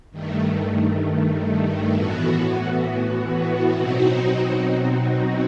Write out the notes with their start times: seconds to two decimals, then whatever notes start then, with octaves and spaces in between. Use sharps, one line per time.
0.11 G2 D#3 A3
1.93 A2 E3 B3 F#4
3.75 B2 F#3 C4 D#4 F#4